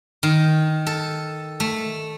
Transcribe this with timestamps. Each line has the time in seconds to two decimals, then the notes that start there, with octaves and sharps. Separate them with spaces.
0.23 D#3
0.87 A4
1.60 A3